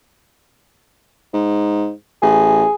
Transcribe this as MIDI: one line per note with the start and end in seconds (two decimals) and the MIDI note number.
1.33 1.91 44
2.22 2.65 33
2.22 2.75 68